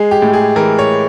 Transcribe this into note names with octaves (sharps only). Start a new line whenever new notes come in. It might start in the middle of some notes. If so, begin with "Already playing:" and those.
Already playing: G#3 G#4
G4
A2
G#4
E3 A#4
C#5